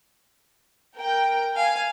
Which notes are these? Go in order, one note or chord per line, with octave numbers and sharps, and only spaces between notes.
A#4 G5
F5 G#5